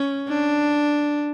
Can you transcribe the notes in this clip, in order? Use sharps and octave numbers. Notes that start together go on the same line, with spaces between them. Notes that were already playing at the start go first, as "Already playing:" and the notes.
Already playing: C#4
D4